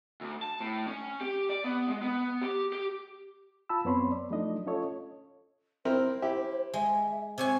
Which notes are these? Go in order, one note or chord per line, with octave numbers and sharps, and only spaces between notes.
D2
A5
A2
C#4
G4
D5
B3
G#3
B3
G4
G4
F4 A5 B5 E6
F#2 B3 C4 C#5 B5 C6
D5
F3 F#3 A3 D4 D#4 D#5
C#4 F4 A4 C#5 D#5
C4 E4 A#4 C5
E4 G4
G#3 E5
C3 C5 C#5 G#5